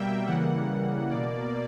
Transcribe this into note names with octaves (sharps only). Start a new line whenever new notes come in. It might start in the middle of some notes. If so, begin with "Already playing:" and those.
Already playing: B2 G3 A#3 E5 G5
C#3 E3 G3 A#3 F#5
B2 A#3 D5